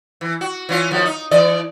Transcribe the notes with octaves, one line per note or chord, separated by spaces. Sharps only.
E3
F#4
E3 C#4 F4
D#2 F3 F#3
D#4
E3 D5 D#5